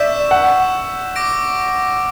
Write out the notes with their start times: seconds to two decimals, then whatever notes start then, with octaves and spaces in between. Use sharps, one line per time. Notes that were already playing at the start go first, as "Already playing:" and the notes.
Already playing: D5 E5 C#6 E6 G6 B6 E7
0.31 F#5
1.16 D6 A#6 D7